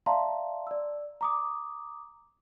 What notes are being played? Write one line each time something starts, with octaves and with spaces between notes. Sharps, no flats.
D5 E5 F5 A5 A#5 C6
D5 E6
A#5 D6 D#6